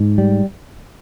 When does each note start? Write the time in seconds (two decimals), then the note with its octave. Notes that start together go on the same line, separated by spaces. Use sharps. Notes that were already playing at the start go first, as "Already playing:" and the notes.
Already playing: G#2
0.18 G3